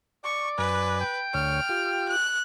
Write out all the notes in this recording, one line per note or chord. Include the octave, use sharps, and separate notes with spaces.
D5 C#6
F#2 B4 G#5
G5
D2 C#5 F6
F4 G4
F#6